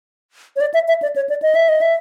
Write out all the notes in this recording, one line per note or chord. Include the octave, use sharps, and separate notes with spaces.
C#5
D5
E5
E5
D5
C#5
D5
D#5
E5
D#5
E5